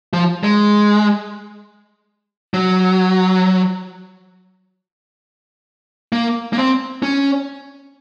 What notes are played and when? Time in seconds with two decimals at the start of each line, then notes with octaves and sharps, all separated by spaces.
0.13 F3
0.43 G#3
2.54 F#3
6.13 A#3
6.53 A#3
6.57 C4
7.03 C#4